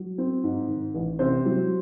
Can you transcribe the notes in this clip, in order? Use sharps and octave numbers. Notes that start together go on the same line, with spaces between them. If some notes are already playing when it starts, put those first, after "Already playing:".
Already playing: F#3
C4
G#2
D#3
A1
C3 C5
F#3